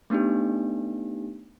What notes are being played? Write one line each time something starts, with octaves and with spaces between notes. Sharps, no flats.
A3 B3 D4 D#4 G4